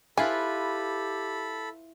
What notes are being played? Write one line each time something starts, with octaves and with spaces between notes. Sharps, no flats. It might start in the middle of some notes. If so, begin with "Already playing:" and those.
E4 F4 G4 A4 B4 G#5 B5